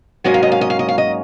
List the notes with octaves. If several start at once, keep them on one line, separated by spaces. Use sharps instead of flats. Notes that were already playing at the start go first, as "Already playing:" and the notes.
G#2 F#3 A#3 C#4 D#5
F5
D#5
F5
D#5
F5
D#5
F5
D#5